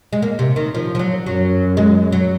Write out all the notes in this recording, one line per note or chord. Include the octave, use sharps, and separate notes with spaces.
G#3
A#3
C3
D#3
F3
F3
F#3
F#2 F#3
G#3
F#3